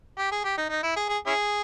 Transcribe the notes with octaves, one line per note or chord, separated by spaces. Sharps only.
G4
G#4
G4
D#4
D#4
E4
G#4
G#4
C#4 E4 G#4